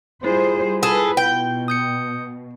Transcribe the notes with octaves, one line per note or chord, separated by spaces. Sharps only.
G3 E4 F4 G#4 C5
G#4 A4 B4
B2 G5
D#6 G6 C#7